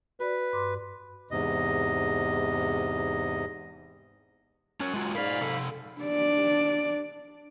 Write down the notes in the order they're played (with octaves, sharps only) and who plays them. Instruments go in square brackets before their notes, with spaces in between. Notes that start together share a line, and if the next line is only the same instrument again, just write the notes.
[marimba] F#4 D5 [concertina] B4
[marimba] G2 C6 D6
[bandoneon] E2 G#2 C3 D#5
[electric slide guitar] C#4 A#4 C#5 [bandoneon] G#5 F#6
[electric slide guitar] G#3 F4 F#4
[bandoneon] G#2 F5 B5 [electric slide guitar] A#4 D5
[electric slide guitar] C3 A4
[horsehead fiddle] D4 D5